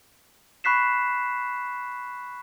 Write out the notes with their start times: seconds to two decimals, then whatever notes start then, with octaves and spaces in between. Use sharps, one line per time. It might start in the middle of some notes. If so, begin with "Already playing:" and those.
0.64 B5 C#6 F#6 B6 C7 E7